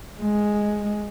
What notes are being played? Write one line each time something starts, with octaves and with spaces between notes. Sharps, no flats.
G#3